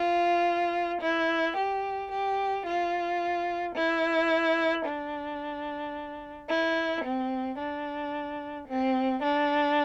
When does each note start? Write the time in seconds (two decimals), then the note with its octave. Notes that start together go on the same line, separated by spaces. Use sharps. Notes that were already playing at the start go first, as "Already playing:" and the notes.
Already playing: F4
1.02 E4
1.57 G4
2.11 G4
2.66 F4
3.76 E4
4.85 D4
6.49 E4
7.04 C4
7.59 D4
8.68 C4
9.23 D4